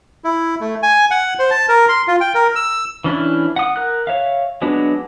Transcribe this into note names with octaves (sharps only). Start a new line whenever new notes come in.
E4
A3
G#5
F#5
C5
A5
A#4
C6
F4
G5
A#4
E6
E3 C#4 D4 E4
F#5 D#6
A#4 F#6
C#5 E5 F5
F#3 G#3 B3 D4